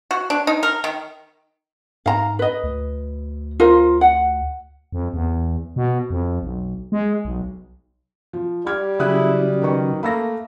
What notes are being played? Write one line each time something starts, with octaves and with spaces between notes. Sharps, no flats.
F#4
D4
D#4
A#4
D#3
G#2 F5 A#5
B4 D#5
D2
F4 A#4 C5
F#5
F2
E2
B2
F2
B1
G#3
B1
F3
G3 D6 F6 G#6
C#3 F#3 E4 G#4 D#6 F#6
D#3 C#4 B4 C#6
A3 A#3 B5 E6 A#6